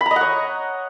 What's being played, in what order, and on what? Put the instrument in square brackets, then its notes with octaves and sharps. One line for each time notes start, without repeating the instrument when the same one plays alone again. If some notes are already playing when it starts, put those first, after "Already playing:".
[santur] B5
A#5
D#5
F#5
C#5